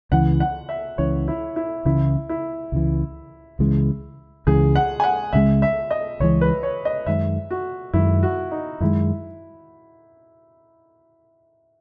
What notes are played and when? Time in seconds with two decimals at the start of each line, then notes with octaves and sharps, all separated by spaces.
0.11 C#2 C#3 E3 F#5
0.40 F#5
0.69 E5
0.98 C#2 C#3 E3 C#5
1.28 E4
1.56 E4
1.85 C#2 C#3 E3 E4
2.29 E4
2.72 C#2 C#3 E3
3.59 C#2 C#3 E3 G#3
4.47 C#2 C#3 E3 G#3 G#4
4.76 F#5
5.00 G#5
5.04 F#5
5.33 C#2 C#3 E3 G#3 E5
5.62 E5
5.91 D#5
6.20 C#2 C#3 E3 G#3 C#5
6.41 B4
6.63 C#5
6.85 D#5
7.07 F#2 D#3 G#3 E5
7.51 F#4
7.93 F#2 D#3 G#3 E4
8.23 F#4
8.51 D#4
8.80 F#2 D#3 G#3 E4